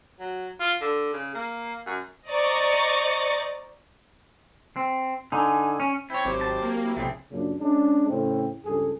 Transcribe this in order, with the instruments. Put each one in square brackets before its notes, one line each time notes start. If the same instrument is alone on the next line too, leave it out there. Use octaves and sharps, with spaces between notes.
[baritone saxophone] F#3
F4
D3
C#3
A#3
F#2
[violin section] C5 D5 D#5 A#5 C#6 A6
[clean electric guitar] C4
[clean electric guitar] D3 D#4 [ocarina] G#5
[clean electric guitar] C#4
[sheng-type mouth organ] C4 G6 [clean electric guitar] E4 C#5
[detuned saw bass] G#1 [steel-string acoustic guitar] F#3 C4 G4 [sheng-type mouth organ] C5 D6
[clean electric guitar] A5
[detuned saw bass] A#3
[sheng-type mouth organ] E4
[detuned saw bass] A#1 [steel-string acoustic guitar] A2 C3 [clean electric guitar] A3 C4 [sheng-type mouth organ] E4 G#4
[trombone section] F#2 A#2 C#3 D4
G#3 C#4 D4
A2 C#3 C4
C#2 G2 G#4 A4